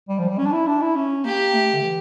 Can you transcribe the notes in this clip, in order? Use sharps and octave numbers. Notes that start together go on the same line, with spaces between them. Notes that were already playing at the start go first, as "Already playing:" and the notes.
G3
F3
G3
C#4
D4
E4
D4
E4
C#4
A#3 G4
A3
D3
E3